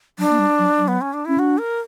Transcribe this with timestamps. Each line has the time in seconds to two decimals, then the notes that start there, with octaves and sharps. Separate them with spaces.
0.18 F#3 D4
0.30 A#3
0.39 G3
0.59 F#3
0.78 F#3
0.88 B3
1.01 C#4
1.13 D4
1.25 C#4 E4
1.38 D4 F#4
1.58 A#4